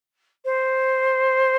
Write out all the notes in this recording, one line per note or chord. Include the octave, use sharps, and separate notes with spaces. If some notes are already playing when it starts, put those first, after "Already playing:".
C5